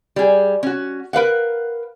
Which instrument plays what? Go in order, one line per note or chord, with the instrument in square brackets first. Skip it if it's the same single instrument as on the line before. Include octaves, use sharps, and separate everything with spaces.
[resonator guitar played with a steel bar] G3 G#4
C#4 F#4
A#4 B4 F5 F#5